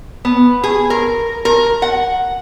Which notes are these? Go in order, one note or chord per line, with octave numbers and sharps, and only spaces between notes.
B3
G#4
A#4
A#4
F#5